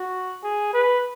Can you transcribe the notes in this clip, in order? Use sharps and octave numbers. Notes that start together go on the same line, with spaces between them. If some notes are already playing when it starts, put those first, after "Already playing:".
Already playing: F#4
G#4
B4